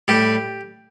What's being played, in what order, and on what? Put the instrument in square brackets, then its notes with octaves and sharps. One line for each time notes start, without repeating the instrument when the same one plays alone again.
[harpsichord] A2 G3 G4